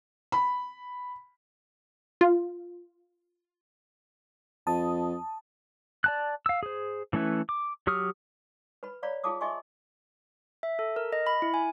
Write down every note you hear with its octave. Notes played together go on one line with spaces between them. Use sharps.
B5
F4
F2 A5 D#6
D5 A5 F#6
F5 E6
G#4 C5
E3 A3 C#4 E4 B4
D6
F#3 G4 C#6 D#6 F6
B4 B5
C#5 D5 F5 A#5 B5
F4 G#4 F5 A5 D6 D#6
G#4 D#5 E5 G#5 C6 C#6
E5
A4
A#4
D#5
B5
E4
G#5